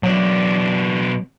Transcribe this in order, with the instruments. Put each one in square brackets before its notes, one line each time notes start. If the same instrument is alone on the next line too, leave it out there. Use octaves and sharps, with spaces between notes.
[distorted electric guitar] B2 D4 [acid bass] F#3